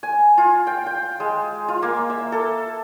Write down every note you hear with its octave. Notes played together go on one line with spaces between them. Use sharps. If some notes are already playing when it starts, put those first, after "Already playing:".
G#5
F4
G5
G5
G#3
F4
A#3
E5
A4